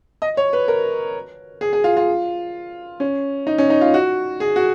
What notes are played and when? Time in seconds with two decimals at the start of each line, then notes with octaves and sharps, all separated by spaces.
0.22 D#5
0.37 C#5
0.53 B4
0.68 A#4
1.61 G#4
1.73 G#4
1.84 F4
1.97 F4
3.00 C#4
3.47 D#4
3.58 C#4
3.70 D#4
3.81 F4
3.94 F#4
4.40 G#4
4.56 F#4